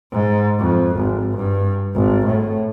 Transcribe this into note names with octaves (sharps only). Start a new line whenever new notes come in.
G#2
F2
G#1
G2
G#1
A2